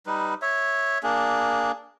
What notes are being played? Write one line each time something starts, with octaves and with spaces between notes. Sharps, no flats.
G3 D#4 B4
C#5 E5
A#3 D4 G#4